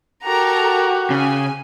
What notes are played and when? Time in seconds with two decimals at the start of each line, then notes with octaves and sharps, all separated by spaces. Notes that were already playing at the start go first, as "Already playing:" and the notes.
0.24 F#4 G4 A4 A#4 A#5
1.10 C#3 G#5